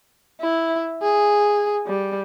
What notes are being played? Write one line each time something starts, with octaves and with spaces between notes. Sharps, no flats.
E4
G#4
G3